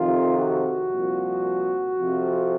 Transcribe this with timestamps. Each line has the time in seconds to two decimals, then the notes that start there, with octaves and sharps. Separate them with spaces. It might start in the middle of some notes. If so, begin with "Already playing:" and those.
Already playing: F2 C3 D#3 F4
0.38 F#4
0.91 C2 A#2 F3
1.99 F2 C3 F3